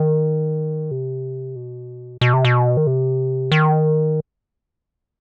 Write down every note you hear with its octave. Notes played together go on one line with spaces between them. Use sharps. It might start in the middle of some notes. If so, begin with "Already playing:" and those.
Already playing: D#3
C3
B2
B2
C3
B2
D#3
C3
D#3